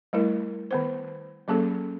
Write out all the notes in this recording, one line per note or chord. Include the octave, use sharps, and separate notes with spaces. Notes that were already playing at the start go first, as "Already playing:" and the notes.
G3 A3 E4 A#4
D#3 B3 C5
F#3 A#3 C#4 G#4 A4